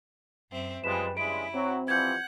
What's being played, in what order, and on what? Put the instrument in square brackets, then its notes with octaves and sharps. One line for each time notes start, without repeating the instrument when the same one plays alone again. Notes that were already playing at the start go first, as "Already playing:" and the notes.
[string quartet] F#2 C4 E5
[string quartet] F#2 G3 [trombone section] C3 F3 G#3 [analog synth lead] B4 [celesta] B6 E7
[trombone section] G2 C#3 G#3 [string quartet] E4 [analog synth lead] B5 [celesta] D7
[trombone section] F#3 [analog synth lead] C4
[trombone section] E3 F3 G3 [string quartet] F#5 [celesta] G6 G#6